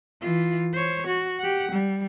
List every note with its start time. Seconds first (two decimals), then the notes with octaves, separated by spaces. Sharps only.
0.21 E3 F4
0.73 C5 C#5
1.07 F#4
1.39 G4 F#5
1.72 G3